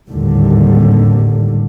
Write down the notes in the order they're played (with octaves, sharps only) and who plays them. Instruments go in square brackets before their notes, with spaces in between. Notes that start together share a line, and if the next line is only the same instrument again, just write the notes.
[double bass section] G#1 D#2 A2 D3 G3